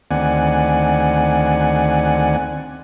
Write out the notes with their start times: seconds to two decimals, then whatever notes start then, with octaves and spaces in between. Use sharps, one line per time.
0.11 D2 D#3 C4 D5 F#5 G#5